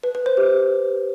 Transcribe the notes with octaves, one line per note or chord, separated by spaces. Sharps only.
B4
B4
C5
G4